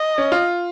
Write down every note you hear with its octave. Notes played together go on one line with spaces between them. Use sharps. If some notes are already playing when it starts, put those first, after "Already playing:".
Already playing: D#5
C#4
F4